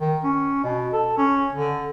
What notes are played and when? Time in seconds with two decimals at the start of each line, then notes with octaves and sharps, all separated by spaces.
0.01 D#3
0.24 C#4
0.64 B2
0.93 A4
1.17 C#4
1.53 D3